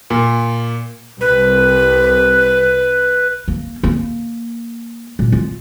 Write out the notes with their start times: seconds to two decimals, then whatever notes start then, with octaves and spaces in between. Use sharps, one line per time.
0.10 A#2
1.21 C2 B4
3.48 A#3
3.83 A#3
5.19 A#2
5.32 F4